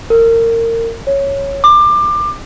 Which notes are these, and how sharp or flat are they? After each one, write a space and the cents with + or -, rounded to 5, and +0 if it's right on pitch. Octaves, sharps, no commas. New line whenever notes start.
A#4 -25
C#5 +0
D6 +25